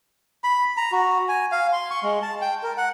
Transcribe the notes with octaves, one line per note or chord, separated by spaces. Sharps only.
B5
A#5
F#4
G#5
F5
C6
C#6
G#3
A5
G5
A#4
F#5